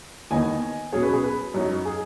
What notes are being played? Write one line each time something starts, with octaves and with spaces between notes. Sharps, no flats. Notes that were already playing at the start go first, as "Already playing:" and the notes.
D#2 D#3 B3 D#4 D#5 G#5
B2 F#3 C#4 G#4 C#5
B4
G#4
B4
F#2 F#3 D#4
G#4